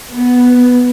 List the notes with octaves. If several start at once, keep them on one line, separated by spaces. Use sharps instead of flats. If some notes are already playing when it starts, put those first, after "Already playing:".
B3